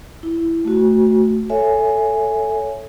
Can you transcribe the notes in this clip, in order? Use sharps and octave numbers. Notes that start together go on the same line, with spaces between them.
E4
A3 F#4
A4 C#5 E5 G#5